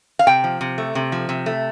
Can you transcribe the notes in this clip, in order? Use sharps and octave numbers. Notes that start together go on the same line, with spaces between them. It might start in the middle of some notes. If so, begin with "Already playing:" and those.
F5
C3 G5
F3
C3
A3
C3
F3
C3
A3